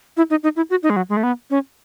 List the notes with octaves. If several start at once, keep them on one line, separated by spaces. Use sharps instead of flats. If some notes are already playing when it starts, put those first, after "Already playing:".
E4
D#4
D#4
E4
F#4
D#4
G#3
F#3
G#3
A3
B3
C#4